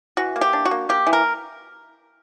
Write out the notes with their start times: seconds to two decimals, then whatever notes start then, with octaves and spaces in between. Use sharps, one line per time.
0.17 E3 F#4
0.36 A#3
0.41 G4
0.53 D4
0.65 F#4
0.71 A#3
0.89 A#3 G4
1.07 E3
1.13 A#4